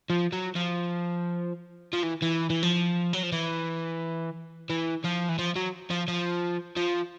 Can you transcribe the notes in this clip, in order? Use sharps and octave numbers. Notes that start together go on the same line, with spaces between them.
F3
F#3
F3
F3
E3
E3
E3
F3
F#3
F3
E3
E3
F3
E3
F3
F#3
F3
F3
F3